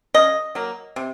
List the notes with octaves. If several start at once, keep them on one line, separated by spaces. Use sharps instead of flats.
C#3 D#5
F#3 A#3
C3